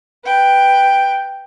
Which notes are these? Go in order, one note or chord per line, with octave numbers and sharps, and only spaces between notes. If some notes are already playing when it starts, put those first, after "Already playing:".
B4 G5